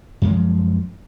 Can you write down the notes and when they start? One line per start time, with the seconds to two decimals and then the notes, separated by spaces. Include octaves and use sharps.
0.22 F#2
0.25 A#3
0.28 G#3
0.30 F3